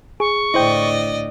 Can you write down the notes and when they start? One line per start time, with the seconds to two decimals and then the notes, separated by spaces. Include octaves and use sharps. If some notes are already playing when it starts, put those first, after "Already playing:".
0.20 G#4 C#6
0.54 A2 D3 E4 C5 D5 D#5 G5